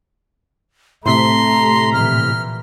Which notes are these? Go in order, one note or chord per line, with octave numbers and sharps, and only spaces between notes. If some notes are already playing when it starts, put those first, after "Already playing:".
A2 C3 A3 A#5 C6 B6
A#2 E3 F6